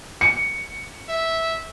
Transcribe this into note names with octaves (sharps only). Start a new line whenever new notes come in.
C#7
E5